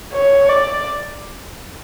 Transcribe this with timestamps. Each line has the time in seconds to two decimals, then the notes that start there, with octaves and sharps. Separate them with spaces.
0.13 C#5
0.49 D5